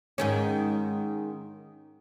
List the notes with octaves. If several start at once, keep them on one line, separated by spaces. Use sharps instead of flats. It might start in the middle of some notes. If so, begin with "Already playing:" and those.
G#2 D#3 C#4